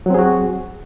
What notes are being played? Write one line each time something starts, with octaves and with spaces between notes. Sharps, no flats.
F#3 C4 F#4 G#4